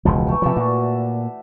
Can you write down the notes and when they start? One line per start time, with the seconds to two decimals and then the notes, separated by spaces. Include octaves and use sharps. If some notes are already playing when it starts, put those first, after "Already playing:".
0.05 E1 C#2 F3
0.27 E3 A3
0.42 C3 F3 D5 E5 A5
0.57 A#2 F#4